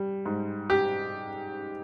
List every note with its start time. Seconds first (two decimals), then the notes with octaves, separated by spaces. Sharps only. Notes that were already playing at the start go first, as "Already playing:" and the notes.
Already playing: G3
0.26 G#2
0.70 G4